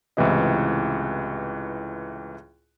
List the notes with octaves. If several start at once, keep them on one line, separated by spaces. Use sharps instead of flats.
C#2 A2 C3 E3 E4 D#5